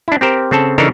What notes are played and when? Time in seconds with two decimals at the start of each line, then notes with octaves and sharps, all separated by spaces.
0.08 D4 E4
0.21 C4 G4 A#4 C5
0.51 C#3 C4 A4 A5
0.78 C#3 E3 D4 D#4 A4 A#4